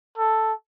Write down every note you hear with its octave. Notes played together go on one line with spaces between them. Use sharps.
A4